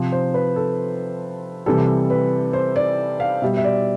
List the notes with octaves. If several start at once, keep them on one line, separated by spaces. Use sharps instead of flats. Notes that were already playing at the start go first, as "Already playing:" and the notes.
Already playing: C3 F3
C5
B4
A4
C3 E3 G3 A4
B4
C5
D5
F5
B2 G3 E5
E5
D5